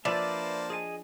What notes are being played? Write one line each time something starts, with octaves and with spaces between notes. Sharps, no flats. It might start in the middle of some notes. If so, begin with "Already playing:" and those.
F3 A#3 D4 B4 C5 D5 E5 A5
G#4 D#5 G#5